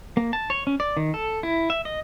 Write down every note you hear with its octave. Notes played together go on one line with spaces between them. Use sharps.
A#3
A5
C#5
C#4
D5
D#3
A4
E4
E5
D#5